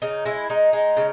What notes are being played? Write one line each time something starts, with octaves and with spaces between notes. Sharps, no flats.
C#3 D#4
G#3 E4
G#3 D#4
G#3
C#3